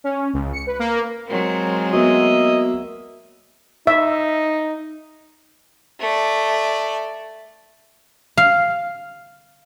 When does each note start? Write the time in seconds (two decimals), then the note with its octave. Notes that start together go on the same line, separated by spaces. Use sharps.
0.04 C#4
0.34 C#2
0.53 C#7
0.67 B4
0.79 A#3
1.28 F#3 G#3 C4 A#4
1.93 A#3 B3 F#4 D#5 E5
3.87 D#4 E5
6.00 A3 D5
8.37 F5